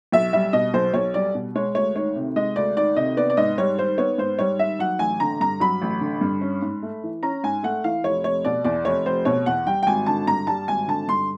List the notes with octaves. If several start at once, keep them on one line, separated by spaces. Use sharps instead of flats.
B1 E5
G3 E5
B2 D#5
B1 C5
B1 C#5
G3 D5
B2
G#3 C#5
D2 C#5
D#3 C#5
C3
G#3 D#5
D2 D5
D#3 D5
C3 D#5
B3 D5
D5
G#2 D#5
G3 C#5
D#3 C5
B3 C#5
G#2 C5
G3 C#5
D#3 E5
F#3 F#5
A1 G#5
D3 A#5
G2 A#5
F#3 B5
A1
D3
G2
C#4
G#2
A3
E3
C#4 A#5
G#2 G#5
A3 F#5
E3 F5
F1 C#5
F1 C#5
B2 D5
E2 D5
F1 C#5
F1 C5
B2 C#5
E2 F#5
G3 G5
G5
G#1 G#5
D3 A5
G2 A#5
G3 A5
G#1 G#5
D3 A5
G2 C6